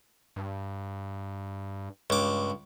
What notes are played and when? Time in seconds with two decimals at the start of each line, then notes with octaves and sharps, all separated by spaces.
0.36 G2
2.10 C#2 G2 D6